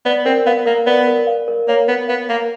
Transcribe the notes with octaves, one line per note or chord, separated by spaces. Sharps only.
B3 D5
C4 A#4
B3 F5
A#3 A#4
B3 D5
A#4
F5
A#4
A#3 C#5
B3 A#4
B3 F5
A#3 A#5